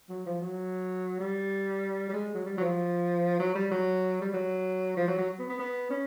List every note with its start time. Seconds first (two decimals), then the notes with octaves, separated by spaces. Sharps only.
0.09 F#3
0.26 F3
0.41 F#3
1.20 G3
2.09 G3
2.13 G#3
2.34 F#3
2.46 G3
2.58 F#3
2.61 F3
3.39 F#3
3.55 G3
3.71 F#3
4.21 G3
4.33 F#3
4.97 F3
5.08 F#3
5.18 F#3
5.39 B3
5.49 B3
5.59 B3
5.90 C#4